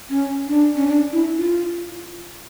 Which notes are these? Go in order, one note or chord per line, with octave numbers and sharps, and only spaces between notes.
C#4
D4
C#4
D4
E4
F4